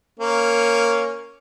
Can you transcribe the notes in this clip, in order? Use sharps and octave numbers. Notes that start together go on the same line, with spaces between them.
A#3 C#4